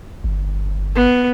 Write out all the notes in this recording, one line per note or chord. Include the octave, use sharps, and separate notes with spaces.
G1
B3